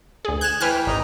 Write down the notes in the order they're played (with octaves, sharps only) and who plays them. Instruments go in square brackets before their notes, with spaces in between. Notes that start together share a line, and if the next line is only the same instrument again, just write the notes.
[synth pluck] D2 G#4
[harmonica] G#5 [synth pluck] F#6 E7
[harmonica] E3 G5 [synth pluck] B4 G#5 F6
[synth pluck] G#1 [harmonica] D#4